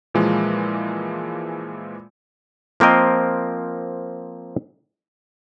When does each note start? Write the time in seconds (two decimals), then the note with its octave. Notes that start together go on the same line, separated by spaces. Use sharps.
0.14 A#2 E3 F3 G#3 A#3
2.80 F3 A#3 C4 A#4 D#5